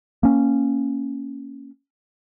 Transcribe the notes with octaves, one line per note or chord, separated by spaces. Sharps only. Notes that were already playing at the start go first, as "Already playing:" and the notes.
A#3 C#4